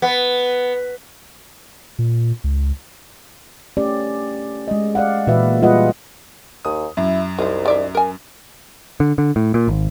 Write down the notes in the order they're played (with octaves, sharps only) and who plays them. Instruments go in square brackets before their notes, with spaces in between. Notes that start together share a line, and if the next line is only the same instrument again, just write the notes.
[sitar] B3
[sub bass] A#2
C#2
[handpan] A3 C#4 G4 D5
G#3 D#5
D5 F5 F#5
A#2 E3 F#4 B4 E5
G3 F4 G#4 B4 D#5 F#5
[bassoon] D#2 [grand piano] D#6
[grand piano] F#2 [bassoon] E4
[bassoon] C2 [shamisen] D#4 C5
[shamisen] D#3 D5 E5
A#4 G#5
[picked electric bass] D3
D3
A2
A#2
G#1